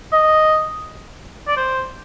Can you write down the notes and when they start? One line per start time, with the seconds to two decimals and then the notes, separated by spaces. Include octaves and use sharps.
0.13 D#5
1.48 D5
1.57 C5